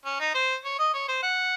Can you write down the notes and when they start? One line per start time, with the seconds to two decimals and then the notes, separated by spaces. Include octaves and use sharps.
0.05 C#4
0.20 D#4
0.34 C5
0.65 C#5
0.79 D#5
0.94 C#5
1.08 C5
1.23 F#5